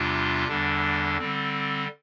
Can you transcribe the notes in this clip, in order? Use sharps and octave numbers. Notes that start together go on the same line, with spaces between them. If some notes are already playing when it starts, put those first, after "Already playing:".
Already playing: E2 C3 G3 D4 F4
E2 D3 G3 D4
D3 G3 C4